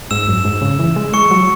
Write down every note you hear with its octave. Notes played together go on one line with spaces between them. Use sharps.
G#2 E6 E7
F#2
G#2
C#3
E3
G#3
G#3 C#6 C#7
F#3